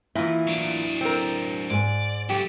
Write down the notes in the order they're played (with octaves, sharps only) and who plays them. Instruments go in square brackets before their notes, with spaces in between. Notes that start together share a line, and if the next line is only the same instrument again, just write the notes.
[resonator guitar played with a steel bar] A#2 E3 [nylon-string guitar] E4
[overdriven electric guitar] F#3 D4
[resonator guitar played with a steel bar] C4 A#4
[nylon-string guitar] G#2 G#5 [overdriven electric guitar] D5
[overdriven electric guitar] F#3 A4 [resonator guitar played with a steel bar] G4